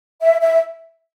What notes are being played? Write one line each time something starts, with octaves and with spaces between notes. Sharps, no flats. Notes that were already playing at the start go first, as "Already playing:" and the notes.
E5
E5